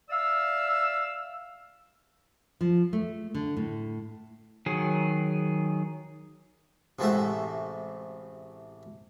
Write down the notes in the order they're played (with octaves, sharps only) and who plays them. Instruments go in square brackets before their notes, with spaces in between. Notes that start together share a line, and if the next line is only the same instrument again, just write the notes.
[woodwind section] D5 E5 F5 E6
[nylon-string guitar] F3
A3
D3
A2
[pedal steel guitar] D#3 F#3 G#4
[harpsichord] A1 C3 G#3 A3 F#4 A4